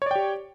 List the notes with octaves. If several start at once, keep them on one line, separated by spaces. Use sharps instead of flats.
G4 C#5 D5 G5